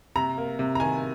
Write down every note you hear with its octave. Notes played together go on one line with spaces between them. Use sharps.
C3 A#5
A#3
C3
A#5
D#3 G#5